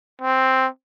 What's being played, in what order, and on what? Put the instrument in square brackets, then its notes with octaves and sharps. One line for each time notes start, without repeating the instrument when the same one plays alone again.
[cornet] C4